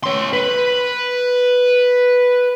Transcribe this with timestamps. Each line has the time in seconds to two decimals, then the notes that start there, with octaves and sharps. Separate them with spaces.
0.04 C#4 C6
0.33 B4